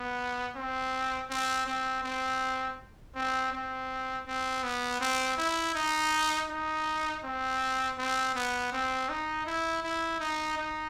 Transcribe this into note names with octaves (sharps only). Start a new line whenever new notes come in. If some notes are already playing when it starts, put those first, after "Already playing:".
Already playing: B3
C4
C4
C4
C4
C4
C4
C4
B3
C4
E4
D#4
D#4
C4
C4
B3
C4
D#4
E4
E4
D#4
D#4